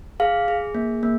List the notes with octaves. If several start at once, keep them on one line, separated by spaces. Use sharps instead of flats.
G#4 F5
G#4
A#3
A#3